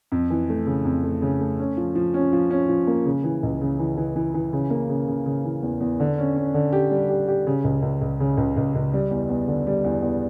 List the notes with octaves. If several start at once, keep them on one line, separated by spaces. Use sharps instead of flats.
F2
E3
A3
C#3
F2
A3
C#3
A3
C#4
F3
F3
C#4
F3
C#4
F3
A#3
C#3
E3
C#2
C#3
E3
E3
E3
E3
C#3
A#3
C#3
C#3
C#3
E3
E2
E2
D3
C#4
C#4
D3
G4
G3
G4
G4
C#3
C#2
C#2
C#2
C#3
C#2
C#2
C#2
G3
E2
E2
D3
G3
E2
E2